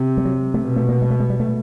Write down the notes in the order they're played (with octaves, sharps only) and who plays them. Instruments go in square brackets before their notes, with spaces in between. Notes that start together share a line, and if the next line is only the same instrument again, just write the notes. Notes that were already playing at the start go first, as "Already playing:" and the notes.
Already playing: [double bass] C3
[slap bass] G3
F#3
A3
[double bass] B2
[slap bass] A3
A#3
G#3
A3
G#3
G3
A3